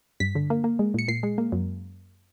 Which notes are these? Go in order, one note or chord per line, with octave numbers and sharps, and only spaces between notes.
G2 B6
D3
A#3
A#3
G#3
A#2 C#7
A#2 C7
G#3
A#3
F#2